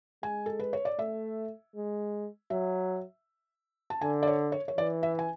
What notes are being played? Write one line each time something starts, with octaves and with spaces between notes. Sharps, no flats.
G#3 G#5
A4
B4
C#5
D5
A3 E5
G#3
F#3 E5
A5
D3 G#5
D5
C#5
C#5
C#5
E3 D5
E5
G#5